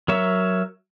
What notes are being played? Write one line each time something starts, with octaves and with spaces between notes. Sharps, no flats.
F#3 A#4 C#5 E5